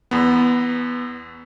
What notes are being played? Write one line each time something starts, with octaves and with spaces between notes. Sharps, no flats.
E2 B3